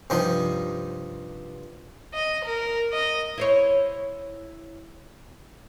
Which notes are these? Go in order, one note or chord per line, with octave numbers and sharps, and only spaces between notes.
G2 C3 F3 D#4
D#5
A#4
D#5
E4 C5 C#5